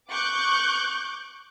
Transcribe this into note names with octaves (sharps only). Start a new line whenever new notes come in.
C#6 D6 F#6 G6